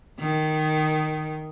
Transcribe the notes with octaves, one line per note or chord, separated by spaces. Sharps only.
D#3